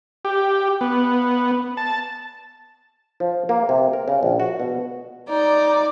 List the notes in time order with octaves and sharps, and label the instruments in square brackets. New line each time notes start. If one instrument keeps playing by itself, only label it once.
[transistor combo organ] G4
B3
A5
[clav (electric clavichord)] F3
A#3
C3
A#4
C#3
A#1
F#4
B2
[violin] D#4 [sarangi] D5